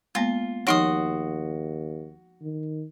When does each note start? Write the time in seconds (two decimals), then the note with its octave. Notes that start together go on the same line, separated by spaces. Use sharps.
0.15 G#3 A#3 B3 F4
0.67 D#2 F3 D#4 F#4 C#5 C6 D#6
2.42 D#3